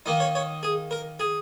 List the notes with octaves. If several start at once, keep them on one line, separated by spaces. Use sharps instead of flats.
D#3 A#3 D#4
C#5
C#5
G#4
A#4
G#4